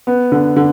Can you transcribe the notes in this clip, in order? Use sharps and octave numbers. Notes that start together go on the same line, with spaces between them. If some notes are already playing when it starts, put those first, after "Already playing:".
B3
D3
D3